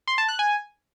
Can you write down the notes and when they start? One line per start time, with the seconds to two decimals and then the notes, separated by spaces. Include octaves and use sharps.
0.08 C6
0.18 A5
0.28 F#6
0.39 G#5